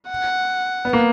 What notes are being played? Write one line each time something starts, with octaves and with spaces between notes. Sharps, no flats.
F#5
B3
A#3